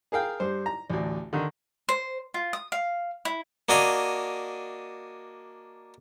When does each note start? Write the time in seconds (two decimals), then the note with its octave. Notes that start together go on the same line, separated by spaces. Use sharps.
0.12 G#4 A#4 F5 G5
0.40 G2 C5
0.66 A#5
0.90 A1 D2
1.33 D3 D#3
1.89 C5
2.34 F4
2.53 D#6
2.72 F5
3.25 E4
3.69 A#3 D4 F#4 D#5 G#5 A#5